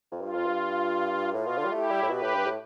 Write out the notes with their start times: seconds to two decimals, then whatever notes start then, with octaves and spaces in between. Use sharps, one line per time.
0.12 F2
0.21 G2 F4
0.34 F2
0.46 G2
1.34 A2 F4
1.47 B2
1.59 D3
1.65 G3
1.72 A3 E4 G4
1.90 G3
2.03 A2
2.09 B2 G4 B4
2.22 A2
2.34 G2
2.46 A2